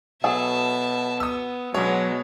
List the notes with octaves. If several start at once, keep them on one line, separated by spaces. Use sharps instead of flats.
B2 F#3 G#4 A4 E5 A5
B3 D#6 E6
B2 F#3 G#3 B3 D4 C#5